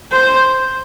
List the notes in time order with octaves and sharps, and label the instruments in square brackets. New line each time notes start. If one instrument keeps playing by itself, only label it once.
[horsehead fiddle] C5